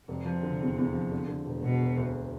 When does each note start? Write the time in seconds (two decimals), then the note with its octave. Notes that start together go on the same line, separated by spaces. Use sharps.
0.08 F1 C3
0.25 F3
0.43 D3
0.60 E2
0.77 E2
0.94 F3
1.12 D3
1.28 D3
1.46 E1
1.63 E1 B2
1.80 E1
1.97 D2